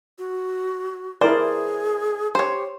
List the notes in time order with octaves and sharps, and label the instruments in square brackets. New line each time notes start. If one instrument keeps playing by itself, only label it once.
[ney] F#4
[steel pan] E4 A#4 D5 [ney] G#4 [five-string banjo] C5
[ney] G4 [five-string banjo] C5 C#5